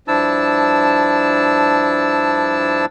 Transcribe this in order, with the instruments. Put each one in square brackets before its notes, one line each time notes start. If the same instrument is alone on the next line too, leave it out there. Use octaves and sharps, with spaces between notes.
[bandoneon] G2 F3 D4 E4 A5 E6